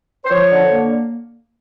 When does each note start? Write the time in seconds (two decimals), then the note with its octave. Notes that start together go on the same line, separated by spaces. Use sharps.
0.25 C5
0.31 F3 C#5
0.51 D3
0.70 A#3